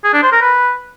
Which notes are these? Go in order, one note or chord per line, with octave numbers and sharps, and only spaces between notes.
G#4
D4
C5
A#4
B4